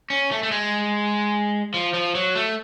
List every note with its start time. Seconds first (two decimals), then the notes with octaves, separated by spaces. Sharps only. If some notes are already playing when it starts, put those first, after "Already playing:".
0.10 C#4
0.31 A3
0.43 A3
0.51 G#3
1.74 F3
1.94 F3
2.15 F#3
2.35 A3